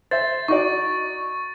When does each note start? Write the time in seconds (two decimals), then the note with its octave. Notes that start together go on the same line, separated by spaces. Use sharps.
0.11 C5 E5 A6
0.48 D#4 F#4 D5 C#6